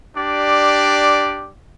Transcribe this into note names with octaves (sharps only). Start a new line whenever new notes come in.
D4 G4 D5